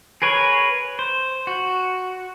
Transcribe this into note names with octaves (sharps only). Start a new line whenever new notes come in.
G#4 A#4 B4 C#5
C5
F#4